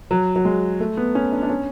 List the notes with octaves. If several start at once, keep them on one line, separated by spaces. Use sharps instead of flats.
F#3
F#3
G#3
A3
B3
C#4
D4
D4
C#4